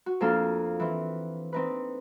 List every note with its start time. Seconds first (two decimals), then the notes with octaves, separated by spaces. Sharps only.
0.06 F#4
0.20 F2 A#3 D4 A4 F5
0.80 E3 C4
1.53 C4 D#4 B4